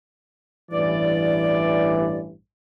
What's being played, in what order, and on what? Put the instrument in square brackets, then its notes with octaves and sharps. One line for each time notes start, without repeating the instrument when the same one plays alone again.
[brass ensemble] A1 G2 E3 [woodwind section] D5